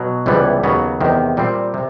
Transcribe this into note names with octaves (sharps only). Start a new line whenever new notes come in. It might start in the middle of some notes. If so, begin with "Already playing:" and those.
Already playing: B2 F#3
C#2 C3 E3 G3 B3
D#2 C#3 F#3 B3
E2 C3 D#3
A#2 G3 C4
C3